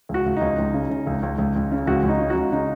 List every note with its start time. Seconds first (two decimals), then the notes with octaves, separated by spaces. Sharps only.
0.09 C#2 F#4
0.26 C#2
0.36 C#2 D#4
0.58 C#2
0.74 C#3
0.90 C#3
1.07 C#2
1.23 C#2
1.38 C#2
1.56 C#2
1.72 C#3
1.87 C#2 F#4
2.03 C#2
2.09 D#4
2.20 C#3
2.30 F#4
2.36 C#2
2.52 C#3 D#4